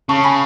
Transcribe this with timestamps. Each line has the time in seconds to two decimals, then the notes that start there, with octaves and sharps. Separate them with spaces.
0.09 C#3 A5 C#6
0.24 G#5 B5